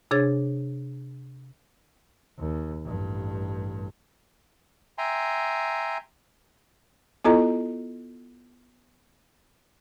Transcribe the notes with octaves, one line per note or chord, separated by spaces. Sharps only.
C3 D4 G#4 C#5 G#6 A6
D#2
A1 G2
E5 G5 G#5 A#5 C6
B3 E4 F4 A4 D#5 A#5